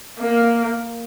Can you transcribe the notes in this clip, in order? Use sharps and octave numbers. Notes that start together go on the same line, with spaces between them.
A#3